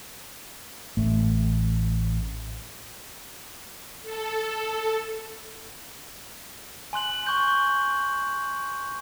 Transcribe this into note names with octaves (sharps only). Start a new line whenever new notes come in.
A1 A3
A4
G#5 C6 F#6 F#7
G#5 C#6 G6
C#6